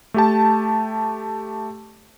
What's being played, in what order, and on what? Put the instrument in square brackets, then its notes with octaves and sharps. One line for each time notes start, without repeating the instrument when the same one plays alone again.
[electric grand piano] A3 G4 A5